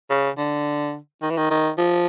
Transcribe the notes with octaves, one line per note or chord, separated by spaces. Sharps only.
C#3
D3
D#3
E3
D#3
D#3
F3